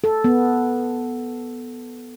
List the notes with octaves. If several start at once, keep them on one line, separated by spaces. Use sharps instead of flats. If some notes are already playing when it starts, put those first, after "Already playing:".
A4
B3